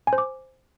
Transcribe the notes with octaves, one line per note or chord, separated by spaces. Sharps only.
G#5
C5
D6